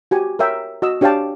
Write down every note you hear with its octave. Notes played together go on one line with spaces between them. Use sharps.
F#4 G4 G#5
A#4 C#5 E5 G5
F#4 D#5 E6
D4 G4 C#5 F5 G5 A5